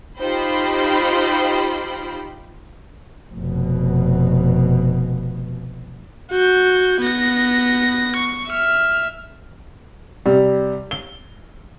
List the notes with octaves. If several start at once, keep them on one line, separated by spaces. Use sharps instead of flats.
D#4 F4 G4 C5 G5 B5
F1 B2
F#4 G6
B3 A#6
C#6
E5 F6
C3 G3
G7